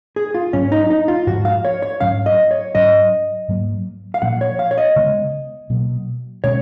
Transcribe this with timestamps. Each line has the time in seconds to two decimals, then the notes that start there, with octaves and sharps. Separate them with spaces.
0.16 G#4
0.35 F4
0.53 G#2 F#3 A#3 C#4
0.72 D#4
0.90 D#4
1.08 F4
1.27 G#2 F3 G#3 F#4
1.45 F5
1.65 C#5
1.82 C#5
2.00 G#2 F#3 C#4 F5
2.26 D#5
2.51 C#5
2.75 G#2 F#3 C#4 D#5
3.48 G#2 F#3 A#3
4.14 F5
4.22 A#2 F3 A#3 F#5
4.41 C#5
4.59 F5
4.71 C#5
4.78 D#5
4.96 C#3 G#3 B3
5.70 B2 F#3 A#3
6.44 B2 G#3 C#4 C#5